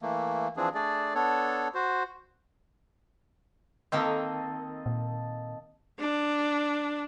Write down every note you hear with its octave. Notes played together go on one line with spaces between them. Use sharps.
E3 A3 A#3
E3 F3 C4 D4 G#4
A3 D4 G#4 D5
B3 D4 A4 C#5
F#4 C5
D#3 A#3 C4 A4 D#5
A#2
D4